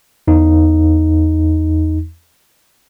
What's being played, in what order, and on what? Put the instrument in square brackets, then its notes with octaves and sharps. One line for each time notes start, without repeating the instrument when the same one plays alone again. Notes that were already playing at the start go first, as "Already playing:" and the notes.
[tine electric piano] E2 D#4